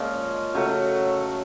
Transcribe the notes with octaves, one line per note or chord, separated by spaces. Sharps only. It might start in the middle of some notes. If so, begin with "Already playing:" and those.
Already playing: A#2 F3 G#3 C#4
C#3 F#3 A3